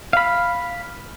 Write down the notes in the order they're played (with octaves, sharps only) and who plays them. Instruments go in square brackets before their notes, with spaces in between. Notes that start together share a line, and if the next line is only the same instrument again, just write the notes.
[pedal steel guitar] F5 B5